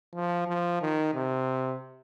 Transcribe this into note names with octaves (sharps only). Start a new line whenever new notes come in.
F3
F3
D#3
C3